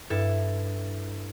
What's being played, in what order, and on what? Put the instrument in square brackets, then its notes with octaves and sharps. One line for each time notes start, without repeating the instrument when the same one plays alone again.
[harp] G2 E4 A4